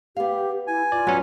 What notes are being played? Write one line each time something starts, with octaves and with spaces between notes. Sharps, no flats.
B3 G4 F5
E4 G#5
F4 D5
F#3 B3 C#4